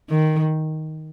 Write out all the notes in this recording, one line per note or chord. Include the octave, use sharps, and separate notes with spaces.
D#3